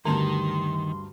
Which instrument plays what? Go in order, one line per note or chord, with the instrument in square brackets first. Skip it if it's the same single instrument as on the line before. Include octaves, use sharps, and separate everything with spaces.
[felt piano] D2 G2 [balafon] D3 A5 [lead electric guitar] D#3 [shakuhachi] C6